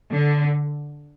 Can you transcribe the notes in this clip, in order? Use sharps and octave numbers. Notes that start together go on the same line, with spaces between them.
D3